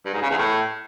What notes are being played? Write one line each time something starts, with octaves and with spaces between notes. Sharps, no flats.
G2
G#2
C#3
E2
A2